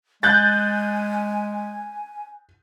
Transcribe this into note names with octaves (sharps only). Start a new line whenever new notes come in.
G#3 G#5 F#6 G6 A6